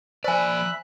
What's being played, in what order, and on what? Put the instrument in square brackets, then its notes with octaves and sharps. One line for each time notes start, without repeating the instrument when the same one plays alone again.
[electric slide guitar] F3 D5 [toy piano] C5 G#5 [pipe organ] E5 B5 F#6